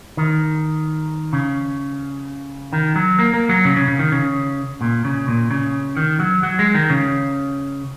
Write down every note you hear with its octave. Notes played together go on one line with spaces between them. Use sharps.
D#3
C#3
D#3
F#3
A#3
A#3
F#3
C#3
C#3
C#3
D#3
C#3
A#2
C#3
A#2
C#3
D#3
F#3
F#3
G#3
D#3
C#3